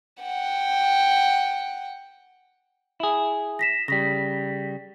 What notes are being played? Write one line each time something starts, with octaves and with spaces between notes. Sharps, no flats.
F#5 G5
E4 G#4
A#6 B6 E7
C#3 G3 A#6 B6